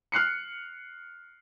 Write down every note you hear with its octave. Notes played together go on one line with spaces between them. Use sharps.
F6 F#6 C7 C#7